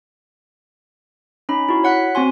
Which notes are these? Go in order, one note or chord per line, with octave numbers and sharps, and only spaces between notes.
C#4 D#4 B5
E4 F#4
C#5 F#5 F#6 B6
C4 F#4 G#5 C6